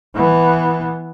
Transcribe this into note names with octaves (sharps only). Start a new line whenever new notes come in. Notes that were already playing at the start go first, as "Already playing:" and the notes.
E3 B3